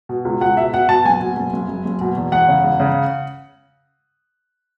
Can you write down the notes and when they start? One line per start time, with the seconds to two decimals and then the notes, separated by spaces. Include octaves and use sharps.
0.09 B2
0.25 C#2
0.41 C#2 F#5
0.57 B2 E5
0.74 B2 F#5
0.89 B2 A5
1.05 F#1 G#5
1.21 B2
1.36 F#1
1.53 F#1
1.68 F#1
1.85 F#1
2.01 B2
2.17 E2
2.32 E2 F#5
2.48 C#3
2.64 E2
2.80 C#3